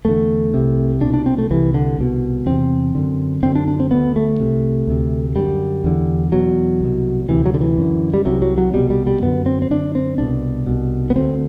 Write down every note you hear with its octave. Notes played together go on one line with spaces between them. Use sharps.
E2 D3 A3
C2 C3
C2 B2 D4
D4
C4
A3
C2 C3 E3
D3
C2 B2
E2 C3 C4
F#2 D3
F#2 D3 C4
D4
D4
C4
D2 D3 B3
A3
C2 C3
D2 C3
F#2 D3 G3
E2 D3
E2 B2 F#3
C2 B2
D2 C3 E3
F#3
D3
E3
F#2 D3
G3
C2 C3 F#3
F#3
F#3
C2 B2 G3
G3
G3
F#2 D3 B3
C4
C4
F#2 D3 D4
C4
C2 B2 D4
C2 B2
B3
D2 D3 C4